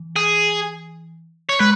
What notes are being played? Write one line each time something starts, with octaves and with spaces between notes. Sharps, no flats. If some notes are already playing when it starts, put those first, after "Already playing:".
Already playing: E3
G#4
C#5
G#3 B4